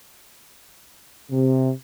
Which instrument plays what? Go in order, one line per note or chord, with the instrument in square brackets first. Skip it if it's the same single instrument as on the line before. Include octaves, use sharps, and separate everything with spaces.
[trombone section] C3